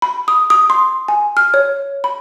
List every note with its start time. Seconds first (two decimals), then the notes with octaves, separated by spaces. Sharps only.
0.02 B5
0.28 D#6
0.50 D#6
0.70 C6
1.08 G#5
1.37 F6
1.54 C#5
2.04 B5